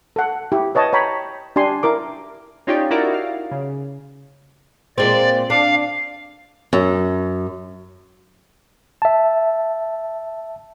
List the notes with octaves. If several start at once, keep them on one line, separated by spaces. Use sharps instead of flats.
A4 F#5
E4 G4
B4 C#5 D#5 A5
C#5 G5 A#5 B5
D4 G4 G#5 C6
E4 A#4 D6
C#4 D#4 F4 G4 C#5 D5
D#4 E4 F#4 A#4 D5
F5
C#3
A#2 G#3 C4 D5
D4 F5
F#2
E5 A5